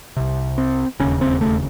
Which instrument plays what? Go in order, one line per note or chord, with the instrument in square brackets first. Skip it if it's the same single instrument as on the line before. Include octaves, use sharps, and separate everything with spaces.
[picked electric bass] C2 C3
C4
E1 D#2 C#3 C#4
C4
A3